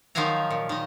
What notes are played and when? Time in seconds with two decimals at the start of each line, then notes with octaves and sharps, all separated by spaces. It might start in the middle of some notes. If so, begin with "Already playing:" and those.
0.15 D#3 F3 F#3 F5 G#5 A#5
0.50 A#2
0.69 D#3 D#5